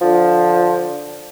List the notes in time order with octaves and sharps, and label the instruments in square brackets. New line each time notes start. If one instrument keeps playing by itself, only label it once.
[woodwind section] D3 F3